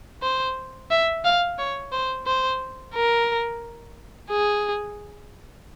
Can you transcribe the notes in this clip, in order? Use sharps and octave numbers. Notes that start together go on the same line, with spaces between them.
C5
E5
F5
C#5
C5
C5
A#4
G#4